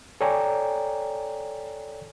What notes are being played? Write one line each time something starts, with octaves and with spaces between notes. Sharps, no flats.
A4 C#5 D5 G5 G#5 A#5